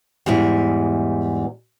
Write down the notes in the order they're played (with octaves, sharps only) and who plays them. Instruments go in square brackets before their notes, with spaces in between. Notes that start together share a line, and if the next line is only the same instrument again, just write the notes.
[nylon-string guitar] E2 G#2 G3 E4